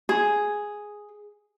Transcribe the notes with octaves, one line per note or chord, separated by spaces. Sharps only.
G#4